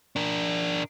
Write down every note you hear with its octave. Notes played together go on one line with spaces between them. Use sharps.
D4 A#4